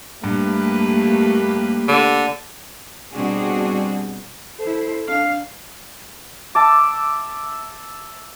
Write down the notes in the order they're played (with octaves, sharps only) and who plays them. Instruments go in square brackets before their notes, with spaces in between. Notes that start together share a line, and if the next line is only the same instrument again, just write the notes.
[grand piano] G2 [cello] A3 [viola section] A#3 G4 B4
[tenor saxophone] D3
[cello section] B2 G3 C4 D4 F#4 G#4
[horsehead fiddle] E4 C5 [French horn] A4
[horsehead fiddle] D4 F5
[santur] E5 A5 D6